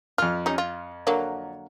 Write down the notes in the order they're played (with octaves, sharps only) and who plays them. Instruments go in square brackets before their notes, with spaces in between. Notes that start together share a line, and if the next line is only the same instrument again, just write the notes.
[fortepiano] F2 F6 [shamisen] F4
[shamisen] G3 C#4 D#4
F4
D3 F#3 A#3